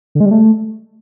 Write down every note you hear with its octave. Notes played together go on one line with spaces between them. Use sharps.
D3
G#3
G3
A3